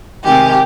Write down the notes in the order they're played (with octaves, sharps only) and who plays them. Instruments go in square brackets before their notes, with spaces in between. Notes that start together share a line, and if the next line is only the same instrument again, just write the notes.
[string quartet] C3 D#3 G#3 G4